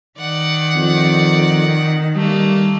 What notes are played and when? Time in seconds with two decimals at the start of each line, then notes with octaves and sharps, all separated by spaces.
0.19 D#3 D5 F#5
0.76 F2
2.16 G3 A3 A#3